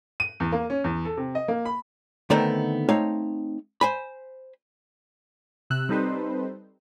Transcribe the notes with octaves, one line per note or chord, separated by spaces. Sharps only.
D#7
E2
A#3
C#4
E2
A4
C3
D#5
A#3
B5
D3 D#3 A3 B3 C4 D#4
A3 C4 D#4 C#5 F5
C5 G#5 B5
C3 E6 F#6
G3 C4 D#4 A4 B4 C5